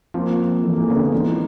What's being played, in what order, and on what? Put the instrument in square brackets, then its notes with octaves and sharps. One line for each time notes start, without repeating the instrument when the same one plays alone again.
[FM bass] F3 [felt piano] A#3 C4
[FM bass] E3 [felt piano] A3
[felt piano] G#3 A#3
[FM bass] C#3 [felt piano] A3 B3
[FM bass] D3 [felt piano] A#3 C4
[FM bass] E3 [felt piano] D#4 F4